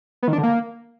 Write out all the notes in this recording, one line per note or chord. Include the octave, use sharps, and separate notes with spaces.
B3
D#3
D4
D3
A#3